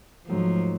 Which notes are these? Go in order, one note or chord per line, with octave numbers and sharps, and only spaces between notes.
G#2 F3 F#3 A3